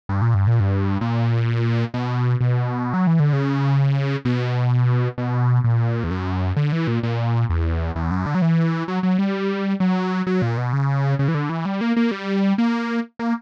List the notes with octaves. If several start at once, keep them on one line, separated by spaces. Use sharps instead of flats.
G2
A#2
G2
A#2
G2
A#2
B2
B2
F#3
E3
D3
C#3
B2
B2
A#2
E2
F#2
D3
E3
A#2
A#2
E2
E2
F#2
D3
F#3
E3
F#3
F#3
G3
F#3
F#3
A#2
B2
C#3
C#3
E3
D3
E3
G3
A#3
A#3
G3
A#3
A#3